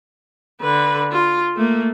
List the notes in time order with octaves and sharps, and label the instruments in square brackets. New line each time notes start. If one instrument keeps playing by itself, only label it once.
[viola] D3 B4
F4
A3 A#3